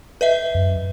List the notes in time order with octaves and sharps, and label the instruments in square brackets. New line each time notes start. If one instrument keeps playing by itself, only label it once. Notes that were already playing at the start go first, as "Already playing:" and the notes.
[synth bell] B4 D#5 E5
[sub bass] F#2